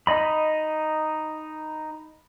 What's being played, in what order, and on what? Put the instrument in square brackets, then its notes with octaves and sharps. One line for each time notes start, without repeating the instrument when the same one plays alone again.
[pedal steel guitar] D#4 D#5 B5